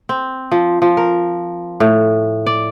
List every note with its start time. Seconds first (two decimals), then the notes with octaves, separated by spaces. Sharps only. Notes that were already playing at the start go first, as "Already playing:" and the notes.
0.09 C4
0.51 F3
0.82 F3
0.97 A#4
1.80 A2
2.46 D5